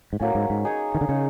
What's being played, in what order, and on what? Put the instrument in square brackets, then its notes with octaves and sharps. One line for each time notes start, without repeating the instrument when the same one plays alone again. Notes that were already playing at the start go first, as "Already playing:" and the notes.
[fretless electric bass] G#2
[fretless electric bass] A2 [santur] F#3 A#3 C#4
[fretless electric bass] G#2
G#2
[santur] D#4 G#4 C#5
[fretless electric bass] D#3
D3
[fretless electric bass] C#3 [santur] D#4 G#4 C#5